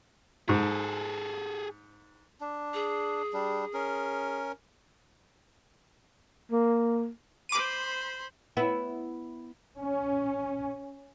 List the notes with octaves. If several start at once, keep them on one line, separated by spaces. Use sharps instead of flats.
G#2 G#4 A4
D4
G#4
G3 D4
C#4 A#4
A#3
C5 B5 C6 D6 D#7
B3 E4
C#4